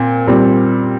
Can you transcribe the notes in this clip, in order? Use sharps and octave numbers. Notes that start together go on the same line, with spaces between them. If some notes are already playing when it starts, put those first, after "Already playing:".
Already playing: A#2 C4
A#2 G3 C4